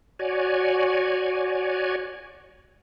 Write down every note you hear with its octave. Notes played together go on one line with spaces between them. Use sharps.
F#4 C#5 D5 G#5